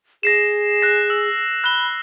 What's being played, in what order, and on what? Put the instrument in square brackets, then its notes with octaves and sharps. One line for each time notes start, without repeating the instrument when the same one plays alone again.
[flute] G#4 [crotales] A#6 C7 E7
[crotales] F#6 A#6
E6
[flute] B5 [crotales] F#6 G7